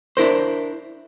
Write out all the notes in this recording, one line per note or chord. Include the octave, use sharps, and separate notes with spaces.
D4 E4 A#4 C5